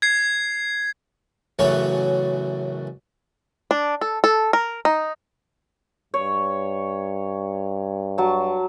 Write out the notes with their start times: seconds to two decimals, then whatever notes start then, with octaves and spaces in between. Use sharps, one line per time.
0.02 G#6 C7
1.59 A1 F#2 C#3 A3 F#4 C#5
3.71 D4
4.01 A4
4.24 A4
4.53 A#4
4.85 D#4
6.14 G2 C#5
8.18 F#3 A5